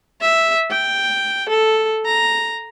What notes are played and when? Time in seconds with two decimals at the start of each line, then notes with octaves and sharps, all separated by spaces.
0.21 E5
0.71 G5
1.49 A4
2.06 A#5